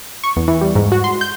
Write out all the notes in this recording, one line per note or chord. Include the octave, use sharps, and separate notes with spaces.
C#6
E2
E3
G3
G#2
F#4
C6
G6